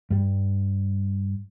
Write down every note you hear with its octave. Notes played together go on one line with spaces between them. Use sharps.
G2 G3